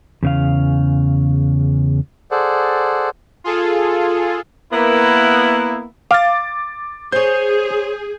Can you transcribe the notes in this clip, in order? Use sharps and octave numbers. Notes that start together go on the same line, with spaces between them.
E2 C#3 F5
G#4 A4 C5 D5 F#5
F4 G#4 A4
A#3 B3 E4
F5 D6 A6
G#4 C5 C#5 G6